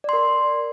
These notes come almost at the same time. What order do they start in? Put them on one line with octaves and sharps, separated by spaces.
D5 C6 A#4